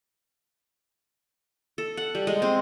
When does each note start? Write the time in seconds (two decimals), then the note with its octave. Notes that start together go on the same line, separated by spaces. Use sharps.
1.78 A4
1.97 F#5
2.15 G3
2.27 G#3
2.42 C4